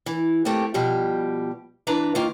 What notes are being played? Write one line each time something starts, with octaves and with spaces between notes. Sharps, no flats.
E3
A3 A#3 C4 G4
B2 F3 G3 G4
E3 D4 B4 A#5
D#3 A#3 F4